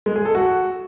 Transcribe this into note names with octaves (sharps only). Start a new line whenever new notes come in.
G#3
G#4
A4
F#4